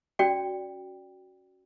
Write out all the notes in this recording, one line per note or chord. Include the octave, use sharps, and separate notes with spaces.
C#4 F#4 D5 G5